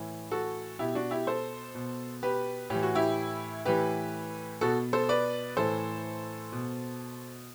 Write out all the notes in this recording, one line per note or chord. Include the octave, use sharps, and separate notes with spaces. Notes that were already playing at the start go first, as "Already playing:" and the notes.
Already playing: A2 E3
F#4 A4
B2 E4 G4
D4 F#4
E4 G4
A4 C5
B2
G4 B4
A2 E3 G4
F#4
E4 G4
A2 E3 G4 B4
B2 F#4 A4
A4 C5
B4 D5
A2 E3 A4 C5
B2